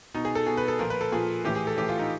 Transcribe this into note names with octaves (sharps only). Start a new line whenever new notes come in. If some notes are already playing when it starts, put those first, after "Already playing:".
B2 D#4
G#4
A4
B2 G#4
B4
A4
A#2 F3 A#4
B4
A4
A#2 F3 G#4
A2 E3 G4
G#4
A4
A2 E3 G4
F4
D#4